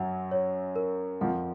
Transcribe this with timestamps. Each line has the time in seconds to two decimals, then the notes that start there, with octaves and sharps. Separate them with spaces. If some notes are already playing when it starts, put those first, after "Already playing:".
Already playing: F#2 F#3 F#5
0.31 C#5
0.76 A#4
1.21 F2 F3 F#5